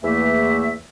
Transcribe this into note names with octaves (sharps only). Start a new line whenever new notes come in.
E2 A3 A#3 E5